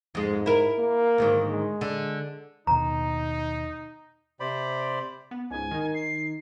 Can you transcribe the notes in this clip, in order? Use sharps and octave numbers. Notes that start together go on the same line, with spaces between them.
F2 G#2 G#3
E4 A#4
A#3
D2 G#2 D#3
G#3
D3
D#2 B2 D#4 A#5
C3 C5 D5 B5
B3
C#2 G#2 G#5
D#3 D#4
C7